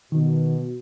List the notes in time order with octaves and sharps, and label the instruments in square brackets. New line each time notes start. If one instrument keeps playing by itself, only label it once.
[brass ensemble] B2 [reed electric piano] D#3